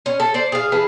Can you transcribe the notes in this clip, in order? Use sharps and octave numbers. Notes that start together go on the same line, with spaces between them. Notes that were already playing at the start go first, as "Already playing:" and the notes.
C#4
A4
C5 D5
G#4 F5
E3 G#4 A4